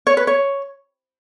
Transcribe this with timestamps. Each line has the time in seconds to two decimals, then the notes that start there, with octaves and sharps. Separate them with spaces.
0.07 C#5
0.17 B4
0.27 C#5